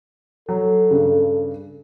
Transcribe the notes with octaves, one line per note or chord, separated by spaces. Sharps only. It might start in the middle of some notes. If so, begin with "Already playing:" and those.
F#3 A4
G2 C#3